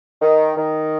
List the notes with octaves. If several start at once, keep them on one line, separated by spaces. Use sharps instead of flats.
D#3
D#3